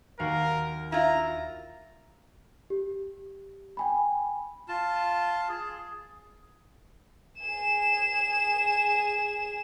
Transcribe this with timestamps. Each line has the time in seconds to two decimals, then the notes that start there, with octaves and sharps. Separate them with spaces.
0.19 D#2 F#4 A#4 F5
0.92 E4 F4 A#5
2.70 G4
3.77 G5 G#5 B5
4.68 F4 A5
5.49 G#4
7.41 G#4 E7